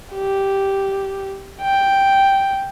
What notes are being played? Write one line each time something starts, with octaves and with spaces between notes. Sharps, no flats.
G4
G5